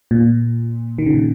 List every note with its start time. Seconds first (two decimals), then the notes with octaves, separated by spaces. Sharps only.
0.11 A#2
0.98 D#3
1.06 C#3
1.14 A#2